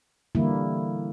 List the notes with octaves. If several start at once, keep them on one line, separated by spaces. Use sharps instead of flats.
D3 E3 G3 A#3 E4